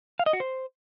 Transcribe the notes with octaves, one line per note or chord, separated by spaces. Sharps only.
F5
D#5
F#4
C5